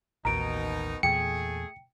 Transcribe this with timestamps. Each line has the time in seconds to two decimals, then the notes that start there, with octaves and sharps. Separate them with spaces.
0.25 A1 D#2 B2 D#3 D#4 A#5 D7
1.03 E2 A#2 A3 G#4 G5 C#7